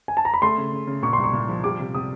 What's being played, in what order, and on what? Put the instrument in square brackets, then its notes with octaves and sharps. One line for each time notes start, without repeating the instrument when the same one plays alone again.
[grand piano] G#5
A5
A#5
B5
[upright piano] A3 [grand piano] C6
[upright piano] C#3
C#3
C#3
[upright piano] A#2 [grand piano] C#6
[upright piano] C2 [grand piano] C6
[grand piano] C#6
[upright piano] A#2
F3
[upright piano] G3 [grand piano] D6
[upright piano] C3
[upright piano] C3 [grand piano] D#6